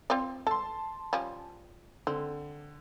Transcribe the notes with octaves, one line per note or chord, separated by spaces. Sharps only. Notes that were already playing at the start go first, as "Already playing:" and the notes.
C4 F4 D5
A4 A5 C6
F3 G3 C#4
D3 C4